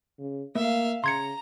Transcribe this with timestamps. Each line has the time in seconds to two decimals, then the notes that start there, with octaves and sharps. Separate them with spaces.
0.19 C#3
0.55 A3 A#3 E5 F5
1.04 C#3 A#5 C6 G#6 C#7